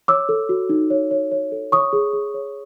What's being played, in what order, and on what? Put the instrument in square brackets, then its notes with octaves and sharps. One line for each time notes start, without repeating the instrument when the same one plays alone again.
[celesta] C#5 D6 E6
A4
F#4
D#4
C#5
C#5
C#5
A4
C#5 C#6 D#6
G#4
G#4
C#5